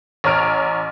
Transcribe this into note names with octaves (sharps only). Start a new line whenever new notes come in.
A1 C#5 A#5 F6 D7